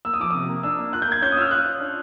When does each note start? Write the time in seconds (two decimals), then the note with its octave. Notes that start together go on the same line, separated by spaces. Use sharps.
0.05 A#3 E6
0.14 D#6
0.20 F3 D6
0.31 C3 D#6
0.49 A#3
0.63 D4 E6
0.78 A#3
0.93 F4 F#6
1.02 G6
1.08 A#3 G#6
1.22 C#4 G6
1.32 D#6
1.37 F4 E6
1.41 F6
1.51 F4 F#6
1.66 C#4
1.80 D4